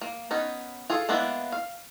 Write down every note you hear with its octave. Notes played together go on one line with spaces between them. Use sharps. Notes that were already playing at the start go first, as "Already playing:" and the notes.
A#3
B3 C#4 D#4
F4 G#4 A4
G#3 A#3 B3 D4 E4
F5